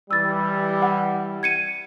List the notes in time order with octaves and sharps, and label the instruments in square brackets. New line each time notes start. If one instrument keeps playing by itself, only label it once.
[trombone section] E3 G3 [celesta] E6 A6
[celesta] F#5
G#6 C#7 D#7